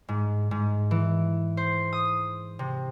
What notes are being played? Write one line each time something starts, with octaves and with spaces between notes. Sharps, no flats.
G#2
G#2
E3
C5
D#6
C3